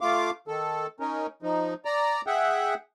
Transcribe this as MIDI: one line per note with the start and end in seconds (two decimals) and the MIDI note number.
0.01 0.30 57
0.01 0.30 65
0.01 0.30 77
0.01 0.30 86
0.48 0.87 51
0.48 0.87 69
1.00 1.27 61
1.00 1.27 63
1.00 1.27 70
1.42 1.74 53
1.42 1.74 63
1.85 2.21 74
1.85 2.21 82
2.27 2.74 68
2.27 2.74 76
2.27 2.74 78
2.27 2.74 79